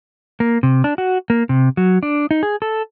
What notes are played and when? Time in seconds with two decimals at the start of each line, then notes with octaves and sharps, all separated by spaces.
0.40 A#3
0.63 C3
0.84 D4
0.98 F#4
1.30 A#3
1.49 C3
1.77 F#3
2.03 D4
2.31 D#4
2.43 G#4
2.62 A4